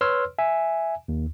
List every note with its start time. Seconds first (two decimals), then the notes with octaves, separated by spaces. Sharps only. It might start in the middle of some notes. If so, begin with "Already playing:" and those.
0.01 B4 C#5 C6 E6 F6
0.39 E5 G#5
1.08 D#2